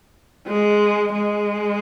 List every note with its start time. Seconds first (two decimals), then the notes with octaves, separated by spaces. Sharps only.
0.47 G#3
1.13 G#3